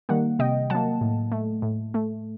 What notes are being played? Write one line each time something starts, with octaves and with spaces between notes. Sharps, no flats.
D#3 G3 A#3 F#5
C3 D#5 G5
F#3 A#3 F#5 A5
A2
A3
A2
A3